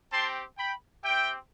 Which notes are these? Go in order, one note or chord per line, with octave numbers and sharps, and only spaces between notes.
C4 G4 A5 C6
G5 B5
C4 G4 E5 G5